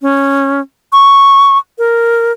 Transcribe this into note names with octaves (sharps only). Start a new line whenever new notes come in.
C#4
C#6
A#4